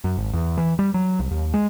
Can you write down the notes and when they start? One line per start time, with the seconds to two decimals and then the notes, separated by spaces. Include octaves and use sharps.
0.04 F#2
0.17 G#1
0.34 E2
0.57 E3
0.79 G3
0.94 F#3
1.19 C2
1.31 D#2
1.54 G#3